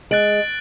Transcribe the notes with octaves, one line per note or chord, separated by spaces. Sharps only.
G#3 F#6 A6 D7 F#7